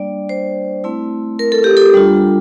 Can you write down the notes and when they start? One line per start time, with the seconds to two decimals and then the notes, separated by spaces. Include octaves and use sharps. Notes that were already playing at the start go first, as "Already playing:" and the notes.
Already playing: G3 A#3 D4 D5
0.29 C5
0.84 A3 C4 E4
1.39 A#4
1.52 A4
1.64 G4
1.77 A4
1.94 G3 D4 F4